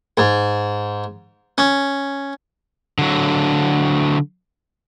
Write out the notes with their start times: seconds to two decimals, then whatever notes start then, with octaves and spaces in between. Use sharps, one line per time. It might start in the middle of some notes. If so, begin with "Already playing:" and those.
0.18 G#2
1.58 C#4
2.99 D3 F#3